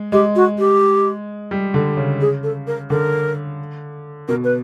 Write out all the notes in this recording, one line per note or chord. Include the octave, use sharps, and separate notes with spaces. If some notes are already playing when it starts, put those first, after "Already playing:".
Already playing: G#3
G#3 G4
F#4
G4
G3
D3
C#3
G#4
A4
A#4
D3 A#4
B2 A#4
B4